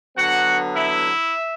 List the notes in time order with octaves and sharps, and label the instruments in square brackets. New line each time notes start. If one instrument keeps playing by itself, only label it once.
[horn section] D3 F#3 B3 F#4 F#5
E4 E5